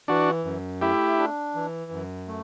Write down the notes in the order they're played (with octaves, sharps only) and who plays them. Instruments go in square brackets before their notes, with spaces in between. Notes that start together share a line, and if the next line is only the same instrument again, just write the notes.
[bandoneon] E3 [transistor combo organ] D4 F#4
[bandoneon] F#2
[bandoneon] A3 [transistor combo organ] E4 G4
[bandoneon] D4
E3
F#2
A3